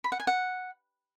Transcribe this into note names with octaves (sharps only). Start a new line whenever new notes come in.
B5
F#5
G#5
F#5